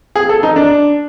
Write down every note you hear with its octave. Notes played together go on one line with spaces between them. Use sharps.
G#4
A4
D#4
D4